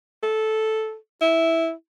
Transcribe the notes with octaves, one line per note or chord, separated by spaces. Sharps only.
A4
E4